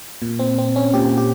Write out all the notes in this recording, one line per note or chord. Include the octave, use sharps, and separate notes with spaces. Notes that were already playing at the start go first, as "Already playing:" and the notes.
A#2
C4
C4
C#4
A#2 G4
G4